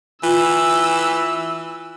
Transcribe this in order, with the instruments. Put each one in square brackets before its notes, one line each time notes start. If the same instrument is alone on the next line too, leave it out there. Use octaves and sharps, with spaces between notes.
[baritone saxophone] E3 [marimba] F4 [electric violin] E6